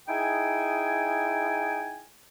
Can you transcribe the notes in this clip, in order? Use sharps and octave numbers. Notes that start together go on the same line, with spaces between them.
D#4 E4 G#4 G5 G#5